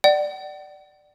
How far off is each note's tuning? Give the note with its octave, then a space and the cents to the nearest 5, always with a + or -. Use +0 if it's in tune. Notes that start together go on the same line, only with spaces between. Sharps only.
D5 +10 F#5 +40